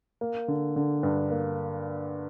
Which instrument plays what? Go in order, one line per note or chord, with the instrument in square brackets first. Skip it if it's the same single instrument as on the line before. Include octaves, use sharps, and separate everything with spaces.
[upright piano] A#3
D3
D3
G2
A#3